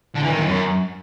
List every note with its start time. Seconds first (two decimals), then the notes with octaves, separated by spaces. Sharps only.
0.15 D3
0.23 E3
0.30 D#3
0.38 E2
0.45 F#2